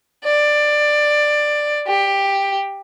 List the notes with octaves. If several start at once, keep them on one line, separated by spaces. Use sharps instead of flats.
D5
G4